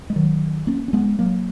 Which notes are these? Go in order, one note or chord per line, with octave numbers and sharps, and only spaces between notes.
G#3
D#3 F#3
A#3 C#4
C#4
G#3 B3
F#3 A#3